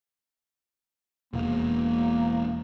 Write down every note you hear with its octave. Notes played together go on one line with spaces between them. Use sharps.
E1 A#3